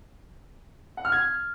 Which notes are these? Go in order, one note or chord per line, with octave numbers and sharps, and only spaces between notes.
F#5
F6
G#6